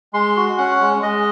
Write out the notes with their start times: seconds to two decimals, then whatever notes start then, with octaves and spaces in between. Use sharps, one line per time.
0.13 G#3 C6
0.36 F#4
0.58 C#4 F#5
0.81 G#3
1.03 G#3 D#5